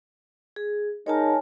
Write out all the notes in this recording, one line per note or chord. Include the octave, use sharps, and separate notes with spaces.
G#4
G#3 D#4 A#4 C#5 G#5 A5